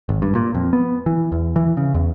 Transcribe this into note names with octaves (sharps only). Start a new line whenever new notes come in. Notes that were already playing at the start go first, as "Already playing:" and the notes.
G#1
G2
A#2
F2
B3
E3
E2
E3
C#3
E2